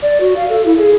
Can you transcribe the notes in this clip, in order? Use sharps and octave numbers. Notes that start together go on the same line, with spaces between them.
D5
F#4
F5
A4
E4
G#4